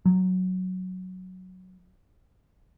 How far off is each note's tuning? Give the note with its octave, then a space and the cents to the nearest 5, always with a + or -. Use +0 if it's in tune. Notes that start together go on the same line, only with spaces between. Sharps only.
F#3 +0